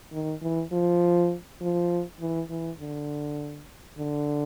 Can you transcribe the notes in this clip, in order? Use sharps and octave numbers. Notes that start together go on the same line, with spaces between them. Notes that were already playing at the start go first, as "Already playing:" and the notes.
D#3
E3
F3
F3
E3
E3
D3
D3